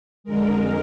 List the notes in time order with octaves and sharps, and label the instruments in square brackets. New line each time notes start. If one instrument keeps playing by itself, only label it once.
[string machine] F2 D3 G#3 A#4